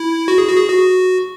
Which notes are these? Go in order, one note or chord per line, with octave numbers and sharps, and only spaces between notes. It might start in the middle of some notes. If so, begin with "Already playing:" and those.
Already playing: E4
F#4
G#4
F#4
G#4
F#4